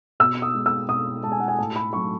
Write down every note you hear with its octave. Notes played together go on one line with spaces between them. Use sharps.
B2 E6
D#6
G#3
E6
B2 D#6
G#3 A5
G#5
F#5
G#5
A2 A5
B5
F#3 A3 C#6